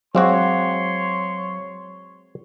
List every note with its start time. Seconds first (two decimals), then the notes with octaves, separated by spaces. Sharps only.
0.15 F#3 G#3 C4 F#4 C#5 F5 C6 D6